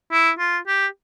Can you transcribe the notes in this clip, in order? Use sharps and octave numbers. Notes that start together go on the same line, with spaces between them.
E4
F4
G4